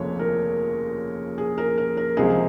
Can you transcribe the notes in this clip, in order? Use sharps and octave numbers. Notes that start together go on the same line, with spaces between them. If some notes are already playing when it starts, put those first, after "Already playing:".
Already playing: F1 D#2 C#3 F3 C#5
A#4
G#4
A#4
A#4
A#4
C#2 C3 F3 G#4